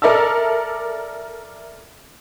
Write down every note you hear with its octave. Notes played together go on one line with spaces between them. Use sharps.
A4 A#4 D5 E5 A5 E6